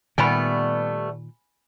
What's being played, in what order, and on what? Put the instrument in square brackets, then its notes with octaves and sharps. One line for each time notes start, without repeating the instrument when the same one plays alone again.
[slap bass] A#2 D#3 [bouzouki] G3 A3 B3 [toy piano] G#5 B5